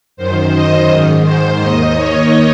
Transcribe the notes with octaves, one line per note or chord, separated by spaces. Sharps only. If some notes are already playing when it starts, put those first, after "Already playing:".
F#2 D#3 C5
D#5
G#2 D#3
C5
D#2 D#3 D#5
C#5